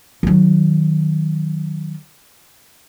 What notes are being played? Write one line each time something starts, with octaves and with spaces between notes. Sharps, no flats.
D#3 F#3